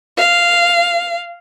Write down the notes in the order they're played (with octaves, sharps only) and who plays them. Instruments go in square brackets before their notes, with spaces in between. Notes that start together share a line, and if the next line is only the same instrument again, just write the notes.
[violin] F5